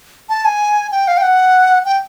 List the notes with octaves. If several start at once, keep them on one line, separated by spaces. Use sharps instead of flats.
A5
G#5
G5
F5
G5
F#5
G5